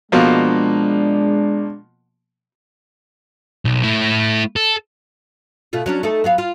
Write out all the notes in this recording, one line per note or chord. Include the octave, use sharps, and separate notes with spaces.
B2 F3 G#3 A#3 D4
B1
A3 E4
A4
B2 A3 F4
F#3 C#4 D4
A3 D#4 A4
F#3 B3 F5
F4